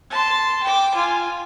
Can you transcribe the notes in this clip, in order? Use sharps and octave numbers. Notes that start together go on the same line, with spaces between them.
A5 C6
G5 D6
F4 G#5